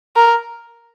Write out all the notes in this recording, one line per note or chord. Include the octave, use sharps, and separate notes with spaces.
A#4